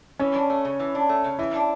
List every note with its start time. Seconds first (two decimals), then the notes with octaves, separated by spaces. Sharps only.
0.19 E3 C#4
0.35 D4
0.50 A3
0.65 C#3
0.80 E3
0.95 D4
1.09 A3
1.24 C#3
1.39 E3 E4
1.54 D4